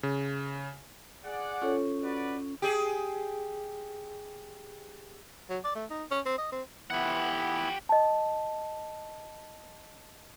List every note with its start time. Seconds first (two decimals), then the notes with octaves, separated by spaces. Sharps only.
0.03 C#3
1.24 G#4 D5 F#5
1.62 C#4 F4 A4 C#5
2.03 F#4 B4 D5
2.62 G4 G#4
5.50 F#3
5.64 D5
5.75 A3
5.90 D#4
6.11 C#4
6.26 C4
6.38 D#5
6.52 C4
6.90 E3 B3 E4 G4 F#5
7.89 D#5 A5